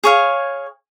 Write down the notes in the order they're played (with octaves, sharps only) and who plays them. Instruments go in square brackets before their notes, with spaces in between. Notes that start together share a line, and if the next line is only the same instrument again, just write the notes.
[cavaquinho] G#4 C#5 F5